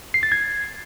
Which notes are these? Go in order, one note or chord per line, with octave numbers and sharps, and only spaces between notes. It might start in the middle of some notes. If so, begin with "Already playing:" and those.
C7
A6
G#6